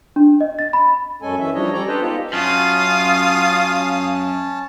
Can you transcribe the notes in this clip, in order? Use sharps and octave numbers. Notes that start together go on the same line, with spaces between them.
D4
D#5
A6
B5
F#2 G#3 C#4 A4 G#5
E3 C#4 E5
F3 G3 D4 C#5 D#5
G3 C#4 A4 C#5 D5 A#5
D4 G4 A4 B4 C5 D#5
G#3 B3 D#4 F4 G4 A4
F#2 C#4 F4 F5 A5 D#6